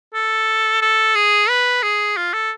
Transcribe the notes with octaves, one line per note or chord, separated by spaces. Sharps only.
A4
A4
G#4
B4
G#4
F4
A4